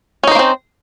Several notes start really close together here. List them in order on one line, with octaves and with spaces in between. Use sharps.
C#4 D#4 C5 A#3 C4